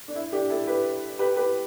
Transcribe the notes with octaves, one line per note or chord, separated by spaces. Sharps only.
D4
E4
D4 G4
E4 A4
G4 B4
G4 B4
G4 B4